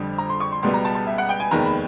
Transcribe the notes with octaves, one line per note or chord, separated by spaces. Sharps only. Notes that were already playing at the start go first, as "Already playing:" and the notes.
Already playing: F2 D3 G3
A#5
C6
C#6
C6
C#2 B2 G3 B3 C6
A#5
A5
A5
E5
F#5
G5
G#5
F1 D#2 D#3 G#3 B3 A#5
B5